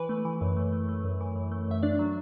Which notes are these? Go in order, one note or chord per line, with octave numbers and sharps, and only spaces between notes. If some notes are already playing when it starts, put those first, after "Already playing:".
Already playing: E3 B4
A3
E3
F#2
A3
A3
A3
F#2
E3
F#2
A3
F#2 E5
D4 D5
F#3